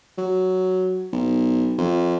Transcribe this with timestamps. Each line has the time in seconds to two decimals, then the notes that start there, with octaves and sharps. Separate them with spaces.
0.18 F#3
1.12 B1
1.78 F2